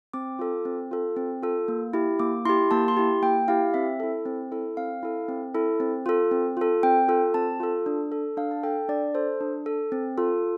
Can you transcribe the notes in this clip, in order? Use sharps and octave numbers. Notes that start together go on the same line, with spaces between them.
C4 D6
F4 A4
C4
F4 A4
C4
F4 A4
A#3
E4 G4
A#3 D6
E4 G4 C6
A#3 A5
C6
E4 G4
A#3 G5
E4 G4 F5
C4 E5
E4 A4
C4
E4 A4
C4 F5
E4 A4
C4
E4 A4
C4
F4 A4
C4
F4 A4
C4 G5
F4 A4
C4 A5
F4 A4
D4
A4
D4 F5
A5
A4 G5
D4 D5
A4 C5
D4
A4
C4
F4 A4